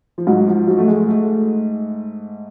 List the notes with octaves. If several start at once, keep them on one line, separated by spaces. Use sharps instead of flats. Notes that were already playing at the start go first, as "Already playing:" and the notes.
F3
G#2 F#3
F3
F#3
A3
G#3
A3